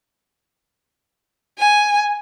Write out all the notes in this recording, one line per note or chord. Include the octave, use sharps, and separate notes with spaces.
G#5